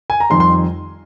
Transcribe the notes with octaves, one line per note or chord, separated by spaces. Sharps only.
G#5
A#5
F2 D#3 G3 C6
C6